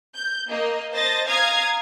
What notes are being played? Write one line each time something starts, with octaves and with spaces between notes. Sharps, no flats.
G6
A#3 D#5
C5 D#5 A5 A6 A#6
F5 A#5 D#6 F6 G#6